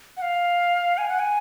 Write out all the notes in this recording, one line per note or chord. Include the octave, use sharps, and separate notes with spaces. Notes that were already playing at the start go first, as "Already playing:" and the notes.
F#5
F5
G#5
F#5
G#5